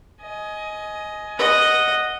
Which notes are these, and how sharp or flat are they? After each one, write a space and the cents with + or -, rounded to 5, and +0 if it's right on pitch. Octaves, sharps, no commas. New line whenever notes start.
D#5 +10 G#5 +20
D#5 -5 F#5 +0